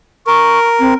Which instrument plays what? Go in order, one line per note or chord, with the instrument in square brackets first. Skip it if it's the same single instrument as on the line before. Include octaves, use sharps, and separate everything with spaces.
[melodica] A#4 [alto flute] C#6
[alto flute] C4